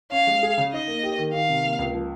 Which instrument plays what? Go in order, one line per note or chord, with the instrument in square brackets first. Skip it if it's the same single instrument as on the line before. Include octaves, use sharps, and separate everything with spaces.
[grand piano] C#4 [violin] F5
[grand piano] G#3
G#4
C#3
[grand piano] D#4 [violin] D#5
[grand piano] A#3
G4
D#3
[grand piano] D#3 [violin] F5
[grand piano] C3
A#3
C#2
F3